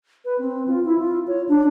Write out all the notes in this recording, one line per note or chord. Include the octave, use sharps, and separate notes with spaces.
B4
C4
F4
E4
F4
C#5
D4